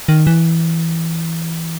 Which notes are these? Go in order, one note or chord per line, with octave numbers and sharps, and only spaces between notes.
D#3
E3